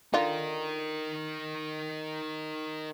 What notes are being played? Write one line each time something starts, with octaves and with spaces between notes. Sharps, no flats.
D3 D#4 F4 A#4